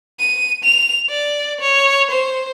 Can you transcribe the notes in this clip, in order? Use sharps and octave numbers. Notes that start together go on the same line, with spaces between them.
D#7
F7
D5
C#5
C5